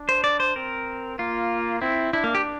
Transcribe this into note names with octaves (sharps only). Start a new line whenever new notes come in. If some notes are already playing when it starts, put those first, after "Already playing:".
Already playing: D4
C5
D5
C5
C4 A#4
A#3 F4
C4 E4
D4 E4
A#3
G4